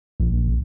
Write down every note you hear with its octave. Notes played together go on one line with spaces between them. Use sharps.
A#1